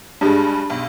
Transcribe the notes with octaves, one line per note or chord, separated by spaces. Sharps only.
G2 G#3 D4 G4
B1